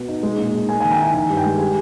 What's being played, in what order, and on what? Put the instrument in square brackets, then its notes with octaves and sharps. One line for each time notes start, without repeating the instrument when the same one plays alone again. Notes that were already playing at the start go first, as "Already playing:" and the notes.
Already playing: [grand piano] B2
D#4
G#3
A#2
D#4
A#3 G#5
D#3 G#5
G5 A#5
E4 G#5
D#3 G#5
G2
G5
G#3
G3 G#5